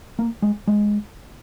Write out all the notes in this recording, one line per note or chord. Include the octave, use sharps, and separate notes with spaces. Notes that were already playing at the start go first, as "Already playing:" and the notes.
A#3
G#3
G#3